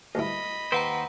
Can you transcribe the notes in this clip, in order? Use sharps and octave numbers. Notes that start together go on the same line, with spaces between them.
D2 G2 E4 D#5 B5
D#2 G4 B4 C5 F#5 A#5